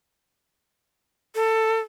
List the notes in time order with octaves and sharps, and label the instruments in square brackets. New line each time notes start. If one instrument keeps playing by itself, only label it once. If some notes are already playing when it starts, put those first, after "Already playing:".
[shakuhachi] A4